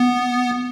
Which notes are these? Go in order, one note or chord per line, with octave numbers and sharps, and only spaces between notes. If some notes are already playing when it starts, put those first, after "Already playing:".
Already playing: B3